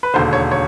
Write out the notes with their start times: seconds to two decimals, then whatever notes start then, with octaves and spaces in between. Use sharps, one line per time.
0.03 B4
0.14 E1 D#2 D3 C5
0.33 C#5
0.51 C#5